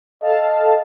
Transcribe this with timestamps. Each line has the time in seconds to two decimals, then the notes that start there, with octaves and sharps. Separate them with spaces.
0.21 A4 D#5 F5 A5